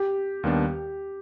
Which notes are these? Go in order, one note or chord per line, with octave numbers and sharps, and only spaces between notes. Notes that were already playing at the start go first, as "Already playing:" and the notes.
Already playing: G4
D#2 D#3 G3 B3 D4